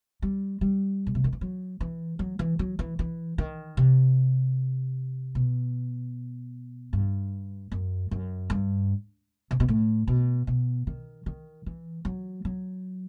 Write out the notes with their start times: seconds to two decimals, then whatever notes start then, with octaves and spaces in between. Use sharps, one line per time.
0.22 G3
0.61 G3
1.07 B2
1.15 C3
1.24 D#3
1.33 E3
1.41 F#3
1.81 E3
2.19 F#3
2.39 E3
2.59 F#3
2.79 E3
2.99 E3
3.38 D#3
3.77 C3
5.35 B2
6.93 G2
7.72 F#2
8.11 F#2
8.50 G2
9.51 C3
9.60 B2
9.68 A2
10.08 B2
10.47 B2
10.87 D#3
11.26 D#3
11.66 E3
12.05 F#3
12.45 F#3